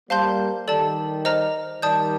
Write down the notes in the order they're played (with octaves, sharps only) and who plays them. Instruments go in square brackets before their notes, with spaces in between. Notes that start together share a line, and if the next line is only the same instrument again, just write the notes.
[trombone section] G3 A#3 [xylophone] C5 F5 A5 C6 G6
[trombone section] D#3 G3 [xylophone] A4 D5 A5
[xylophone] C5 D#5 A#5 F6
[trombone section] D#3 G3 [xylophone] D5 A5 D#6 G6